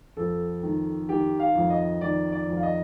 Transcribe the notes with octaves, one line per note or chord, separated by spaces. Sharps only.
F2 A4
D#3
D#3 G4
F5
F2
D#5
D#3 D5
D5
F2
F5
D#5